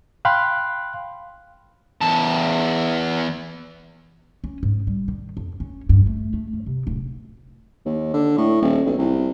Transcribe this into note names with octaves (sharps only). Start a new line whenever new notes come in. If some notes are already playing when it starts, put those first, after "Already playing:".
F5 G5 B5 C6 F#6
E2 A5
C#4
G#2
G3
D#3
F2
C#4
G2
A3
A3
G2
C3
D1
D#2
D3
A2
D#1
B1
C2